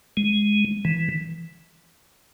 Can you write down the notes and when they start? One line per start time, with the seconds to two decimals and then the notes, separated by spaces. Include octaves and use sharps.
0.17 G#3
0.85 E3